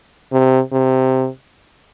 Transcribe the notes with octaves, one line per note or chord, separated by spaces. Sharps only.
C3
C3